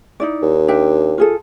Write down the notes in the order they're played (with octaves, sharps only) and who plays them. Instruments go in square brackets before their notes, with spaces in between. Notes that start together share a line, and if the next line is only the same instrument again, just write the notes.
[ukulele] D#4 E4 D5
[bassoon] D#2
[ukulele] D4 E5 G5
F4 G#4 A4